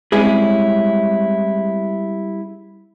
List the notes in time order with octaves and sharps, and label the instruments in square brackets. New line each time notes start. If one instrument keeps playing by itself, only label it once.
[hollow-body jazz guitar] G3 G#3 C4 C#4 E4 G#4